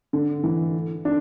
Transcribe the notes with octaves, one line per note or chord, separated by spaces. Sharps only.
D3
E3
D4